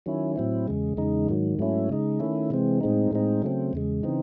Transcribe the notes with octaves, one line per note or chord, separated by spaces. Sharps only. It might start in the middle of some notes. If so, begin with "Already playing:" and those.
D#3 F#3 C#4 E4
A2 F#3 C4 E4
E2 C#3 G#3
E2 C#3 G#3 D#4
G#2 D#3 F#3
G#2 F#3 A3 C#4 E4
C#3 G#3 D#4
D#3 A3 C#4 E4
C3 E3 G#3 C4
A2 G#3 C4 D#4
A2 G#3 C4 D#4
C#3 F#3 A3 C4
E2 C#3 G#3
C#3 E3 C4 D#4